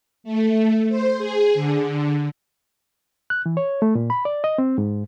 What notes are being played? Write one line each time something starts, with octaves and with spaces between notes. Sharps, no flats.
A3
C5
G#4
D3
F#6
E3
C#5
A3
A#2
B5
D5
D#5
C4
G#2